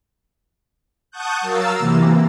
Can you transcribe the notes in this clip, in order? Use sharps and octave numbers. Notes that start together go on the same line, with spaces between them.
F#5 A5 C#6 D#6 F#6 G6
F#3 A#4 F5 E6 A6
C3 E3 A#3